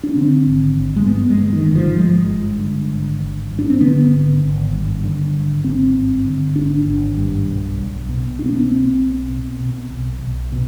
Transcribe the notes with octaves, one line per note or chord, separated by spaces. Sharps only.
D4
D3 C4
G#1
G#1
G#3
G2 B3
G#3
D3
D#3
G#1
F3
G#1 G#3
G2
D3
G#1
G#1
G2
D4
C4
D3 B3
G#1
G#1
G2
D3
G#1
G#1 C4
G2
D3
G#1 D4
G#1
G2
B1
B1
B2
B2 D4
C4
B3
C4
B1
B1
B2
B2
B1
B1
B2